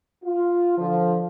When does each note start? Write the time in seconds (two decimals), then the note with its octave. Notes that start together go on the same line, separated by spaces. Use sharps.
0.24 F4
0.77 D3 F3